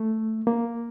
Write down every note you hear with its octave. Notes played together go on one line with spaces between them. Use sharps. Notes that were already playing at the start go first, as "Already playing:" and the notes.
Already playing: A3
A#3